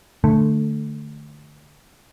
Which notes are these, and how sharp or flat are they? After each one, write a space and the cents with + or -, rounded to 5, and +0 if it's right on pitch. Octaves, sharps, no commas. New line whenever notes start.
D3 +20 A3 +0